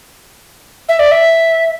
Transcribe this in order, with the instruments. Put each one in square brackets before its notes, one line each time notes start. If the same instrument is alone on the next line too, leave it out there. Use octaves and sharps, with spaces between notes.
[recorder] E5
D5
E5